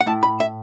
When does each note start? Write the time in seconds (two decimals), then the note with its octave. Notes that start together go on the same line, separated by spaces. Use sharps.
0.01 F#5
0.06 A2 A3 E4 A5
0.23 B5
0.40 E5